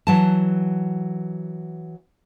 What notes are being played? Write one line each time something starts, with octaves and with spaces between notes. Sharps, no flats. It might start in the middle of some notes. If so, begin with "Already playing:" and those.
E3 F#3 A5